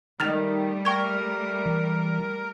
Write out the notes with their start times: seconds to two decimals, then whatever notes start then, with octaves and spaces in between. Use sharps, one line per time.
0.20 D#3 G3 A3 F6 A6 F7
0.85 A#4 G5 C#6 G#6
1.66 E3